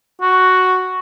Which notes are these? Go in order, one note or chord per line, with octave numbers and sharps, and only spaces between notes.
F#4